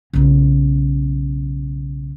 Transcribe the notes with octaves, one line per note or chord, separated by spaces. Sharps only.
B1 C#3